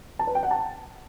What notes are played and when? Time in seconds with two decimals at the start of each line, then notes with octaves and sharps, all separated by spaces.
0.19 A5
0.27 B4
0.35 G5
0.43 F#5
0.51 A5